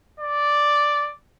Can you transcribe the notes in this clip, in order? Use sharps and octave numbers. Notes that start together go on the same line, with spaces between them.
D5